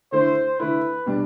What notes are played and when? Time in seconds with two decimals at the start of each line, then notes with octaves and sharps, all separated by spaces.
0.12 D3 A3 E4 C5
0.59 D3 A3 E4 B4
1.06 B2 G3 D4